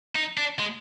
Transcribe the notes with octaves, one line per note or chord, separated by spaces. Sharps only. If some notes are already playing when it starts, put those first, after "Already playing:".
D#4
D4
G#3